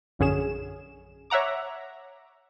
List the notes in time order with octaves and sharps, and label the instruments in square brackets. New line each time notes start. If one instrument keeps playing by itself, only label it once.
[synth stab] A#1 F#2 D3 C#4 G#4 E7
C#5 E5 F#5 A#5 D6